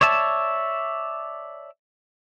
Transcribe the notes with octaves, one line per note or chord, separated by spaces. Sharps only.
C#5 D5 E5 A5